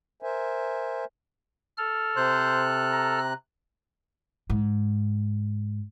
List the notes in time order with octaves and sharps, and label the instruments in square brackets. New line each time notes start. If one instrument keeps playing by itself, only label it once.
[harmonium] A#4 C5 E5 G#5
[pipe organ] A4 F6
[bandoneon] C3 F#6 [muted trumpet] C5
[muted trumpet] A#5
[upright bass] G#2